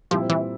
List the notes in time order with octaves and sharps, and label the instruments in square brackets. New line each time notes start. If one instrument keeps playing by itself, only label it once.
[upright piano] A#2 G3 C4 E4 [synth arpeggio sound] F3
[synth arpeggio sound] E3